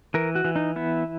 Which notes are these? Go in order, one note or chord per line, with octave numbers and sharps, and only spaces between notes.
E3 A#4
F#4
E3
D#4
B3 E4